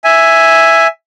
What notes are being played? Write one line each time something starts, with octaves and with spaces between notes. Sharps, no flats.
E5 G#5